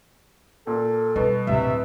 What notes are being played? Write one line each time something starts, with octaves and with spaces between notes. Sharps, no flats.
A#2 A4
B2 G3
D1 A2 C3 E5